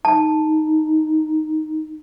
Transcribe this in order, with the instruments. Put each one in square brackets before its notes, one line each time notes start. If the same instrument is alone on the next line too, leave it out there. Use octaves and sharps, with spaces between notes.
[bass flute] D#4 [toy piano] A5